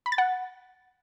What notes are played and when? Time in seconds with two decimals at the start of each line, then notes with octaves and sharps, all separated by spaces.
0.06 B5
0.12 A6
0.18 F#5